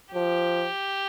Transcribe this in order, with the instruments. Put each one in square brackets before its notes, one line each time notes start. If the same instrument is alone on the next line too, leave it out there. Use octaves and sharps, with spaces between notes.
[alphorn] F3 [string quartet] G4